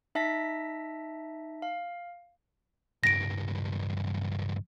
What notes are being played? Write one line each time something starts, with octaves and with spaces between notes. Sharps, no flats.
D#4 E5 A5 A#6 B6
F5
C#2 G2 A#6 D7